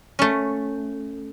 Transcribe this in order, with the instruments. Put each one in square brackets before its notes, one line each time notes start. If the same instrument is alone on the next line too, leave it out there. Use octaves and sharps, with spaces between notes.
[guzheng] A3 C#4